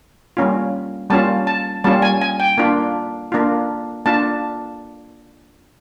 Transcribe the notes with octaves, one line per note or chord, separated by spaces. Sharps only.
G3 A#3 C#4 F4
G3 A#3 C#4 F4 A5
A5
G3 A#3 C#4 F4 A5
G#5
G#5
G5
A#3 D4 F4
A#3 D4 F4
A#3 D4 F4 A5